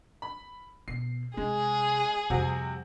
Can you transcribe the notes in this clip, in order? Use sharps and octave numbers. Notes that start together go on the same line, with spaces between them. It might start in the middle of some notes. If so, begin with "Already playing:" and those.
B5
B2 C7
C3 G#3 G#4
F2 C3 G3 C4 F#4